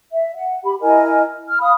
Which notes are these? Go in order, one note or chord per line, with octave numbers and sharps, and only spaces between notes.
E5
F#5
G4 B5
E4 A#4 D#5 G#5
F6
F5 B5 D#6